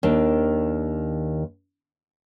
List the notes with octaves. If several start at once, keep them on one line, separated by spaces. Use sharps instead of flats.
D#2 D#3 D4